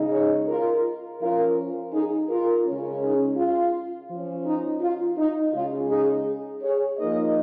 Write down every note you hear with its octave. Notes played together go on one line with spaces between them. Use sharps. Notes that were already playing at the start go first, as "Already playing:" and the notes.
Already playing: C#3 G#3 D#4
G#4 C#5
F4 A#4
F3 C#4 F4 A#4
D#4 G#4
F4 A#4
C#3 G#3 C#4
D#4 G#4
F4
F3 C#4
D#4
F4
D#4
C#3 G#3 C#4 F4
D#4 G#4
G#4 C#5
F3 A#3 D#4 A#4 D#5